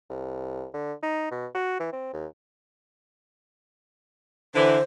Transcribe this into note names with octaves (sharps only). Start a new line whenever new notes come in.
C2
D3
D#4
B2
F#4
E3
C4
D#2
D3 E3 C5